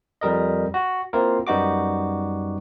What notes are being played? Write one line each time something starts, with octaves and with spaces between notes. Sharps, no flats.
F2 G3 A#4 D#5
F#4
A#3 C4 E4 F4 A#4
F#2 G3 B3 D#4 F#4 D6